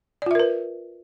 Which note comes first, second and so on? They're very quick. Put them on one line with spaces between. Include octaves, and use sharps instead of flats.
D5 F4 E5 A#4 B4